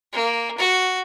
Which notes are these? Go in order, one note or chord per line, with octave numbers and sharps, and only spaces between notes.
A#3
F#4